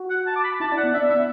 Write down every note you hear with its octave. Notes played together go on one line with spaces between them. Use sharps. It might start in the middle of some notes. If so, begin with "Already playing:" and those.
Already playing: F#4
F#5
A5
D6
B5
E4 A5
D4
F#5
B3
D4 E5
B3 E5